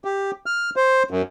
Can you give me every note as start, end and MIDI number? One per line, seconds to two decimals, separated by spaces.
0.05 0.31 67
0.46 0.70 89
0.76 1.03 72
1.11 1.22 42